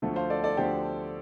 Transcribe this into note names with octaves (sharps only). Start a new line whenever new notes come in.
D2 D3 F3 A3
C5 F5
A4 D5
A4 D5
D2 D3 F3 A3 G4 C5